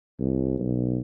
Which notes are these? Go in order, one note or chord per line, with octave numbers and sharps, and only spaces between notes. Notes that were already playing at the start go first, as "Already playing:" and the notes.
C2
B1